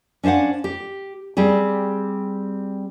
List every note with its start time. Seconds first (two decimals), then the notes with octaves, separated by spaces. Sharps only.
0.23 C#4 D4 C5 F5 F#5
0.64 G4
1.37 G3 C4 G4 G#4